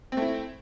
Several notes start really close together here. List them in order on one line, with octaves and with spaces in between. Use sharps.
C4 A3 E4